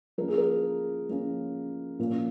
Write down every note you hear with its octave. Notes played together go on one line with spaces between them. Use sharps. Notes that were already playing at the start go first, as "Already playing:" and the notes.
F3 A#3 C#4 A#4
G#4
A#4
F3 A#3 C#4
A#2 F3 A#3 C#4